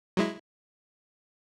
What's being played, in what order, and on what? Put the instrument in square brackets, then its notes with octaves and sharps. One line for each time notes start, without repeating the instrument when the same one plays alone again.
[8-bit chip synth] F#3 G#3 E4